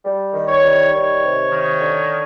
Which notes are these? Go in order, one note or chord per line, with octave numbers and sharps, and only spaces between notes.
G3
D#3
C#5
G3
D#3 C#5
C3
D#3
D3